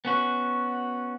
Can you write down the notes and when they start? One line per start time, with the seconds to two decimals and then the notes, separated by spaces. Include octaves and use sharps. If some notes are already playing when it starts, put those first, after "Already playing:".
0.05 B3 C#4 F#4